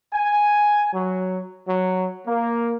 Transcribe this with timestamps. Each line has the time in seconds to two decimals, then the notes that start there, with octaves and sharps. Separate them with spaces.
0.13 G#5
0.94 F#3
1.68 F#3
2.27 A#3